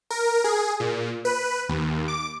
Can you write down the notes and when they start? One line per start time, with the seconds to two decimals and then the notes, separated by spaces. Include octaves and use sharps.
0.10 A#4
0.44 G#4
0.80 A#2
1.25 B4
1.69 D#2
2.08 D6